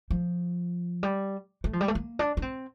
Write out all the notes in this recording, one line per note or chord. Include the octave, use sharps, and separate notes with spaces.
F3
G3
A3
F3
G3
A3
A#3
D4
D4
C4